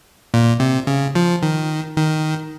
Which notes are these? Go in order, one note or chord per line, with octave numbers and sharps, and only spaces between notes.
A#2
C3
C#3
F3
D#3
D#3